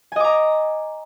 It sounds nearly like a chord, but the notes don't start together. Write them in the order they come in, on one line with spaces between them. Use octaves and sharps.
G#5 D#5 D6 A#5